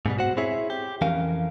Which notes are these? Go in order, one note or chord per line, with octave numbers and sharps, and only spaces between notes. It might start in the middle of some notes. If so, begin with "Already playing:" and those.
G#2 B2 G3
F#4 C5 F#5
C4 E4 G#4 C#5 E5
G4
F2 E3 C#4 A#4 F5